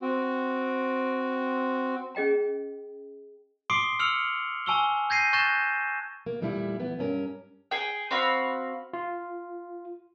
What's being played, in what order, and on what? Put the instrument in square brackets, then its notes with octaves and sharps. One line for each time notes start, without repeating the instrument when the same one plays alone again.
[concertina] C4 F#4
[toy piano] C#4 G#4 D#5 G5 A#5
[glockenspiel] C6 D6 D#6 C7 D7 G7
E6 F6 C#7 F7 F#7
G#5 A5 C#6 E6 F7 G7
G6 G#6 A#6 C7 D#7
C#6 F#6 G6 A6 A#6 E7
[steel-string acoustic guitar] A#3
E2 A#2 G3 A3 E4
E3 B3
G2 C#4 A#4
[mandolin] G#4 G5
C4 F#4 F5 B5
[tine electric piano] F4